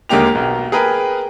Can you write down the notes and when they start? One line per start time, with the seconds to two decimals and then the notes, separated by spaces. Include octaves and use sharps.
0.09 D#2 D3 G#3 A#3 G4 F7
0.35 B1
0.72 G#4 A#4 B4 G5